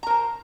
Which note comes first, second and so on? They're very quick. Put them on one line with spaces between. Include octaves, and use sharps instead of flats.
A#5 A#4 C5